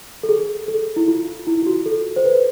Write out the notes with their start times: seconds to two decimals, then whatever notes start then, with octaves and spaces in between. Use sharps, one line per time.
0.23 A4
0.29 G#4
0.68 A4
0.96 E4
1.08 F4
1.47 E4
1.62 F4
1.66 F#4
1.86 A4
2.16 C5
2.25 B4